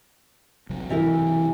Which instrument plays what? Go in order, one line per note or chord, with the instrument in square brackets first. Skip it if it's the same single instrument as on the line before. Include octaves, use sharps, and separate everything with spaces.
[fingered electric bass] B1 C3 F#3
[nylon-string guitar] E3 G4 A#4